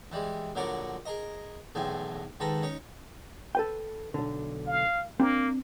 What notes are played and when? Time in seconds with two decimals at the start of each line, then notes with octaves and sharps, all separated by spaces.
0.12 E3 G3 G#3
0.55 A#1 D3 F#3 A#4 C#5 D5
1.06 G#4 A#4 D#5
1.75 B1 E2 A2 C4 G#5
2.40 G#2 D#3 A4 B4 A#5
2.63 C#4 D#4 C#5
3.55 A4 B4 G5
4.14 B1 D3
4.67 F5
5.20 A#3 C4 D4